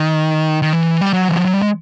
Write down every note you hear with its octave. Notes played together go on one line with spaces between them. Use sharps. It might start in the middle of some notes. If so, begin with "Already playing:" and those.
Already playing: D#3
D#3
E3
G3
F#3
E3
F3
F#3
G3
G#3